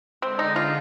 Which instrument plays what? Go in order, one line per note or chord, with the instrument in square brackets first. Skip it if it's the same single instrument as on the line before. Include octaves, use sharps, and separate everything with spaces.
[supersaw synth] D3 G#3 D4 [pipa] C4
[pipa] D#4
F4